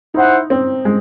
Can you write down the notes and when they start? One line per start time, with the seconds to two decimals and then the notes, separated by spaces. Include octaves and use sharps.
0.14 D#4 E4 C5 F#5
0.50 C4
0.85 G#3